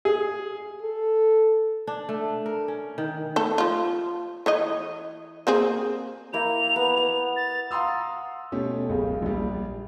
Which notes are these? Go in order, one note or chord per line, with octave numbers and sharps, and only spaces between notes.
G#4
A4
D4
A3
A#4
C#4
D#3
A3 A4
F3 F4
E3 C#5 D#5
A#3 C4 G#4
A#3 E4 G5 F7
B3
B3
A6
F5 F#5 A#5 C6 D#6 E6
B2 A3 C#4 G4
F#1 C#2
A#1 G3